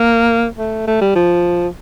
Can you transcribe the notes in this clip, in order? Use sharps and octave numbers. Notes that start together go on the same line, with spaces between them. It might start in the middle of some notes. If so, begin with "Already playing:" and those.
Already playing: A#3
A3
A3
G3
F3